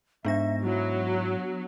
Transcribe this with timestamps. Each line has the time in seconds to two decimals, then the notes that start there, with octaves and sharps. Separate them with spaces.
0.25 G#2 B3 D4 E5 A#6
0.64 F#3 E4